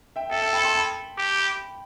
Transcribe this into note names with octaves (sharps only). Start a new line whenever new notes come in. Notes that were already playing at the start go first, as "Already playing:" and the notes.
E5 G5
A4 E5 G5
E5 G5
G5 B5
A5 C6
G5 B5
G4